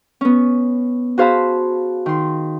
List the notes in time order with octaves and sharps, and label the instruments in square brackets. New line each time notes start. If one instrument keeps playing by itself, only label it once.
[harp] B3 C#4
F#4 G#4 C5 F5 A5 B5
D#3 C6